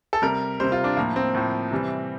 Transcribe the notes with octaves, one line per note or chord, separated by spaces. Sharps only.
A4
C3 G3 A#4
C3 G3 C5
F4
D4
A2 F3 A#3
C4
A2 F3
C3 E3 G3